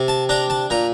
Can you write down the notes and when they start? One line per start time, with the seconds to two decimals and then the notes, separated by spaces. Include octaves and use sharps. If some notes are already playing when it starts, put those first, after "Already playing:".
Already playing: C3
0.08 A5
0.29 D4 A#5
0.50 A5
0.70 A#2 A#5